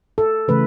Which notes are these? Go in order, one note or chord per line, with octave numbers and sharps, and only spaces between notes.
A4
C#3 E3 A3 B4